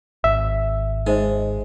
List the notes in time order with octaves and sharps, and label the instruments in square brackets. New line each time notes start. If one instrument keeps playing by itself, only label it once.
[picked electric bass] G#1 [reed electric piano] E5
[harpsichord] G#3 [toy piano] D#4 C5 D#5